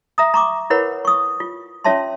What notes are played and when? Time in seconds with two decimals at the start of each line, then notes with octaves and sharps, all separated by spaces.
0.18 E5 A#5 D#6
0.34 A#5 C#6 D6
0.70 E4 A#4 B4 C#5 F#5 B5
1.05 C#6 D#6
1.40 F4
1.84 C#4 F4 C#5 E5 A5 C6